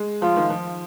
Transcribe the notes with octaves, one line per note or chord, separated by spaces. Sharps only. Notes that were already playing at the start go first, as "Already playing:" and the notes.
Already playing: G#3
F3 F4
D#3
F3